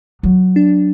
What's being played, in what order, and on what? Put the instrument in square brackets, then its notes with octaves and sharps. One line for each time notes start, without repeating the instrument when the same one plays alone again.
[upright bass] F#3
[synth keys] D4